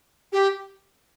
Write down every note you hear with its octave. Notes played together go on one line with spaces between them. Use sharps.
G4